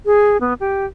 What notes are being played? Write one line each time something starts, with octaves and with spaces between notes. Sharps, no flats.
G#4
B3
G4